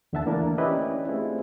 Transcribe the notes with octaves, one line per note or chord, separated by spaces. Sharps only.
D#2 D3 E3 E5 F#5 A5
E3 A3 A#3 D4 E4 A#4
C#4 E4 G4 B4 D5 D#5
A3 C4 E4 F4 G#4